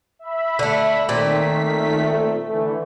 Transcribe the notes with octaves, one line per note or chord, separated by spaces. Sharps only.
E5 B5
D3 A3
A#2 D#3 A3 C4 B6
A3
D3 E3 A3